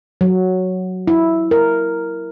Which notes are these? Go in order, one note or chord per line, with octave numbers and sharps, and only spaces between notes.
F#3
E4
A#4